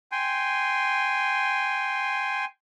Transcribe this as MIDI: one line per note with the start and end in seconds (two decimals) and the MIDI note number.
0.12 2.45 79
0.12 2.45 80
0.12 2.45 84